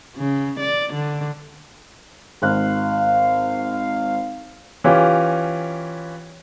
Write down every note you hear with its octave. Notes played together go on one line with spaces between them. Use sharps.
C#3
D5
D3
G#1 F5 F#6
E3 C#4 F4 G4